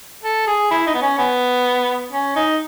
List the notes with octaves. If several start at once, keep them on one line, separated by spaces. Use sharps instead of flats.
A4
G#4
E4
D#4
B3
C#4
B3
C#4
D#4